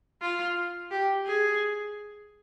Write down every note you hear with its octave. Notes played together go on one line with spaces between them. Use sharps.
F4
G4
G#4